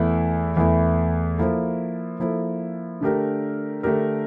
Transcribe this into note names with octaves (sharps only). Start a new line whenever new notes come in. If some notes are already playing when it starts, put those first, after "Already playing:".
Already playing: E2 E3 A3 E4
E2 E3 A3 E4
F3 A#3 E4 A4
F3 A#3 E4 A4
D3 A3 D4 G4 A#4
D3 A3 D4 G4 A#4